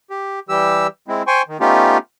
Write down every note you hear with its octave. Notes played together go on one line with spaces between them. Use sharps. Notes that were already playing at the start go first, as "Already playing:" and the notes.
G4
E3 G3 G4 E6
G#3 C4 E4
C5 G5 G#5 C6 C#6
D#3
A3 B3 C#4 D#4 F4 G4